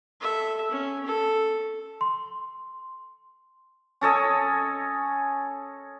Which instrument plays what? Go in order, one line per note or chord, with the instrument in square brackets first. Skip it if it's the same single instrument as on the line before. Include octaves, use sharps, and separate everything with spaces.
[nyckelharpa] A4 E5
C#4
A4
[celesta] C6
[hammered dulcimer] C#4 A4 C#5 D#5